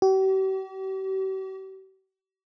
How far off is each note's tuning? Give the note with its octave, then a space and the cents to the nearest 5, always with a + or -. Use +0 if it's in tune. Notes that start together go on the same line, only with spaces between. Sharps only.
G4 -45